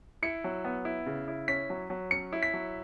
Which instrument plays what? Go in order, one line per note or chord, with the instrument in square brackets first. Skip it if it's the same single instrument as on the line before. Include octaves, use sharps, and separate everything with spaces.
[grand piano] E4 C#7
F#3
B3
E4
C#3
E4
C#4 B6
F#3
F#3
C#4 C#7
E4
B6
F#3